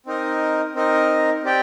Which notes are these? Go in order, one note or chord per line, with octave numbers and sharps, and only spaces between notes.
C4 D#4 A#4 D#5
C4 D#4 A#4 D#5
C4 G4 D5 G5